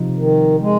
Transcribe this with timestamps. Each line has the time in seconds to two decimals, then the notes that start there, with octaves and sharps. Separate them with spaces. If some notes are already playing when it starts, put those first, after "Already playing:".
Already playing: C3 F3 D#4
0.17 D#3
0.60 G#3